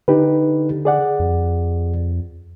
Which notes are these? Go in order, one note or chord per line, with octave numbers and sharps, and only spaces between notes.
D3 D#4 G4 B4
G#4 D5 F#5
F2